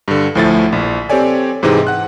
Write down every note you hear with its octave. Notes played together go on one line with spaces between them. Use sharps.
G2 D3
D2 A2 F3 A3 E4 A6
A#1
C4 G4 A4 C#5 D5 G#5
G#2 C3 E3 G#3 C4 D#4
F#5 F#6